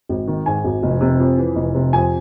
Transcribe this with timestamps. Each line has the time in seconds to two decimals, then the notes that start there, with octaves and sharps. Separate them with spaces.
0.09 G#1
0.27 D#3
0.46 G#2 G#5
0.64 G#1
0.83 F1
1.01 C3
1.20 F2
1.38 E3
1.56 F1
1.74 C3
1.93 F2 G#5